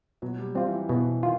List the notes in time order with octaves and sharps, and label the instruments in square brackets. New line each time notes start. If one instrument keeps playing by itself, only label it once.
[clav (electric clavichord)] B2 [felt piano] F#3
[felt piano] G3
[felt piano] F#3 [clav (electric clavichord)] G3 C4 F4
[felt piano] E3
F3
[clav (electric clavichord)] B2 [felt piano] E3
[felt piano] D#3 [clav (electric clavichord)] F4